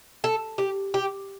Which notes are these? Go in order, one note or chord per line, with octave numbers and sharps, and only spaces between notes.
A4
G4
G4